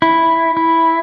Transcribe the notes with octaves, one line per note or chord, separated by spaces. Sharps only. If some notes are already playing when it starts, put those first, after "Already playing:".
E4
E4